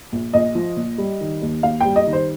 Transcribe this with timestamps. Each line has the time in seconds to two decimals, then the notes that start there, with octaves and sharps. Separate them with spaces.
0.12 A#1
0.33 A#1 D#5
0.55 F3
0.77 A#2
0.98 G3
1.21 D#3
1.42 D#2
1.63 D#2 F5
1.81 G3 G5
1.96 D#5
2.07 D#3
2.13 C5